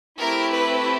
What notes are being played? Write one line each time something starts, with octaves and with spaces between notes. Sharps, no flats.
A3 C4 E4 G4 A#4
B4